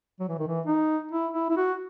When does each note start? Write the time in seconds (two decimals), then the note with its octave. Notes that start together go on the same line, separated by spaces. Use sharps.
0.20 F#3
0.29 E3
0.39 D#3
0.47 E3
0.66 D#4
1.11 E4
1.34 E4
1.50 E4
1.57 F#4